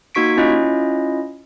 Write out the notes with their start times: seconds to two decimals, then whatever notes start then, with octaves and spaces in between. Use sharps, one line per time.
0.15 A#3 D#4 F#4 C#6 B6 D7
0.37 C#4 E4 F4 D#5